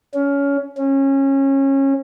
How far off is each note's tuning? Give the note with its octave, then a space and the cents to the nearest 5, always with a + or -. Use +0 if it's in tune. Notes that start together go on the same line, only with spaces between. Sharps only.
C#4 +20
C#4 -25